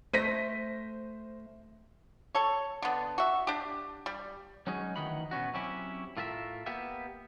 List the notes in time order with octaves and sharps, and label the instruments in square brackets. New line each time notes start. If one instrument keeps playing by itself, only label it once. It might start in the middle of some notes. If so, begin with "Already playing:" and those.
[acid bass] A3 [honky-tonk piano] C5 [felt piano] A#6 B6 D#7
[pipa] A4 C#5
D3 B3
F#4 E5
D4 G4
G3
[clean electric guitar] F#3 G#3 C#4 D#4 F#4 G#4
D2 D#3 E3 D#4 F#5 B5
B2 B3 C#4 F#4
F#3 C4 C#4 E4 G4
A2 A3 F4 A#4 B4 E5
A#3 B3 G4 E5